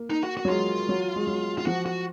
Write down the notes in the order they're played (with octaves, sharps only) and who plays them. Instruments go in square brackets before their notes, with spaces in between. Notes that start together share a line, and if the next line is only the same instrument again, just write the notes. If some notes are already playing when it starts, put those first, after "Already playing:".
Already playing: [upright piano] A#3
[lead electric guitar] D#4
F#4
F#4
[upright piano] F#3
[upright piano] G#3 [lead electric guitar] F4
[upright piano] F#3
G#3
F#3
[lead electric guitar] F4
[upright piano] F3 [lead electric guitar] F#4
[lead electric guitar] F#4